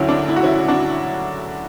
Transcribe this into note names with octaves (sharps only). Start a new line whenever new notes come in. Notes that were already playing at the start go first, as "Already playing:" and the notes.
Already playing: D2 D3 F#3 C#4 E4
D4
E4
F#4
C#4 E4
D4 F#4